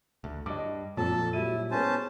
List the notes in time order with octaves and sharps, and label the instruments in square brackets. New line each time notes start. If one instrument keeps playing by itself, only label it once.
[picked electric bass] D2
[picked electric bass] G2 [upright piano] D#5 D6
[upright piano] F2 [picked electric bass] A#2 [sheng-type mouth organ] A4 A5
[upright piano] F#3 G3 D#7 [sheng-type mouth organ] E4
[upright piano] B3 G#4 [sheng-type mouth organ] C#4 C5 A5